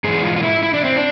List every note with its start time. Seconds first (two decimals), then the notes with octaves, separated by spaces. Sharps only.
0.04 G#2 E3 G#4
0.23 F4
0.36 F4
0.43 E4
0.63 E4
0.74 D4
0.85 C4
0.96 D4